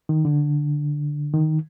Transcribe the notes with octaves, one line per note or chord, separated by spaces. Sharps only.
D#3
D3
D#3